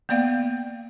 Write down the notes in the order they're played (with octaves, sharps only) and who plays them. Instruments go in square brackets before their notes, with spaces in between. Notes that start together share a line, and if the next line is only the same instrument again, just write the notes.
[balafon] A#3 B3 D5 F5 G5